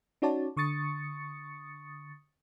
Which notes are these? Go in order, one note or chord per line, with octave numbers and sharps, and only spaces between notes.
C#4 D#4 F#4 C#5 D5 A5
D3 C#6 D#6 A6 C#7